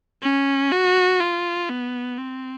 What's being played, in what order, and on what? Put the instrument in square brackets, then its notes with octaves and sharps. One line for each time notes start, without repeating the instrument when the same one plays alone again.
[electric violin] C#4
F#4
F4
B3
C4